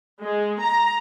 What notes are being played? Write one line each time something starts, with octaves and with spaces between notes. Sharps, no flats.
G#3
A#5